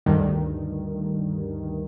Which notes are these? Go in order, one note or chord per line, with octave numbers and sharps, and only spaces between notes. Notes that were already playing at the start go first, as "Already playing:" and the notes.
D2 G2 D#3